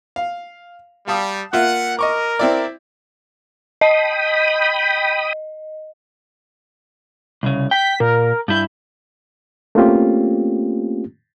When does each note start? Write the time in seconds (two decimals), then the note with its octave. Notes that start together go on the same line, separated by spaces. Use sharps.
0.16 F5
1.08 G3 F5 A5 D#6
1.53 A#3 F4 E5 F#5
1.99 A#4 D#5 C#6 D6
2.39 C4 E4 D5
3.81 D#5 G5 B5 D#6
7.43 C2 C#3
7.71 G5 B6
8.00 A#2 A#4
8.48 G2 E4 G6
9.75 A3 A#3 C4 C#4 F4 G4